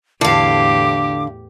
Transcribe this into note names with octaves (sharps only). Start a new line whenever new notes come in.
E2 A2 D3 G4 F5 D6